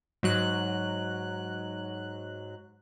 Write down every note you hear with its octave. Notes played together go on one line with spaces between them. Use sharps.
G#2 F#3 F#6